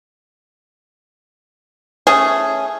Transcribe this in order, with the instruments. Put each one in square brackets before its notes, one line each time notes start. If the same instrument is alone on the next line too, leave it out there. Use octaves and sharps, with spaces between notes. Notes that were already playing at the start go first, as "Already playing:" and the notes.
[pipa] A3 C#4 G#4